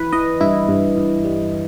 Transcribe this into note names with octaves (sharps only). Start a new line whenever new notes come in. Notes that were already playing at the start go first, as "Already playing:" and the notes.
Already playing: E3 B4
E3 D#5
G2 E4
G2
G2
G3